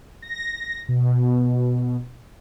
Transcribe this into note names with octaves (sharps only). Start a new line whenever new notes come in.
A#6
B2